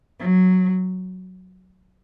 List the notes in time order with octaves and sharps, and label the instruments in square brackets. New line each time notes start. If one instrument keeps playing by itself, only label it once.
[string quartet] F#3